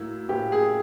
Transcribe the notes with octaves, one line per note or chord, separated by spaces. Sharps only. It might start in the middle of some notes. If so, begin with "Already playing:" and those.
Already playing: A2 F#3 A#3 E4
A2 F#3 A#3 G4
G#4